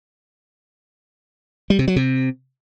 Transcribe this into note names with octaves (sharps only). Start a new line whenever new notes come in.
G3
C3
F#3
C3